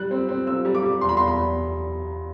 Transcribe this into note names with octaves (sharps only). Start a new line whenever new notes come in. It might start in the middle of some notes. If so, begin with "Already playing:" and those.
Already playing: G3 F#6
C4
C4
C4 E6
G3
D6
G3
E2 C6
B5
E2 C6
B5
E2